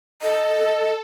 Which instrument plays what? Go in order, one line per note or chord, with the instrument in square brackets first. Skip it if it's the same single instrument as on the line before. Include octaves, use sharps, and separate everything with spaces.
[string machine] A4 [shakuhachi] D#5